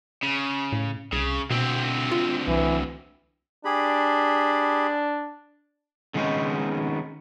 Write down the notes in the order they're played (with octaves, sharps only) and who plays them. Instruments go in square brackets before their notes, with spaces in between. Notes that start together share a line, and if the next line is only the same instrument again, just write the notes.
[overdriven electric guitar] C#3
[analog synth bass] A2
[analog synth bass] C2 [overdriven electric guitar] C#3
[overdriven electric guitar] D2 C4 [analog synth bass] B2
[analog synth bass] F4
[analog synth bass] C2 [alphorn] E3
[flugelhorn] D4 [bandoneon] G4 G#4 B5
[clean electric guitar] D3 D#3 G#3 B3 C#4 D#4